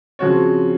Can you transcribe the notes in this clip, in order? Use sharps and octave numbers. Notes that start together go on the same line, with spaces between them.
C#3 F3 C4 F#4 C#5